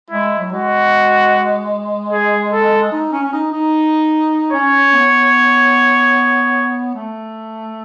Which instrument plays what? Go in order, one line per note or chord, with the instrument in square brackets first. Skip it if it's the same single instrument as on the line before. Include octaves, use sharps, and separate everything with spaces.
[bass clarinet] G#3 [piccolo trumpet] E4
[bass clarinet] F#3
[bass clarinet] G#3 [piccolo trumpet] F#4
[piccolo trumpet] G#4
A4
[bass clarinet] D#4
C#4
C#4
D#4
D#4
[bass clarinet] C#4 [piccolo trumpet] C#5
[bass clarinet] B3
A3